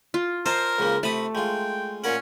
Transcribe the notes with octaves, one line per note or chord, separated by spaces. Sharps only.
F4
A#4 C5 D#5 A5 A#5
C#2 C#3 A#3
C3 A3 B5 D#6
G#3 F4 G5
A#2 C#4 A#4 F#5